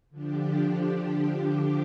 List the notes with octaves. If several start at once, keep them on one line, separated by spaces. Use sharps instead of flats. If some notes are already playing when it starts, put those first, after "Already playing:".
D3 F3 D4 G4